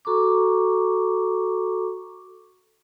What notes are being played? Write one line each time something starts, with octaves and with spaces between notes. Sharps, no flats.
F#4 A4 A#5 C#6 D6